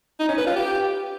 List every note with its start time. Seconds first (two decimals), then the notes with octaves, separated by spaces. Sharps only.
0.20 D#4
0.29 C#4
0.38 B4
0.47 F4
0.56 G4